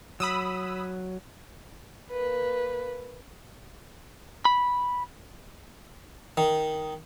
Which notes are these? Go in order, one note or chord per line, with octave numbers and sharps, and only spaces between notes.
F#3 B5 D#6 E6
A#3 B4
B5
D#3